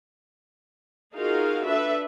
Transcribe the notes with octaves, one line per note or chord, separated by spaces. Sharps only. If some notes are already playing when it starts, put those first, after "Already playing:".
D#4 F4 F#4 G#4 A#4 F5
D4 A4 B4 E5